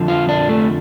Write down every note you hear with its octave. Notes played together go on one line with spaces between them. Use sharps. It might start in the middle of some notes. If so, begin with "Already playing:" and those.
Already playing: F2 D3 F3
F4
D4
A3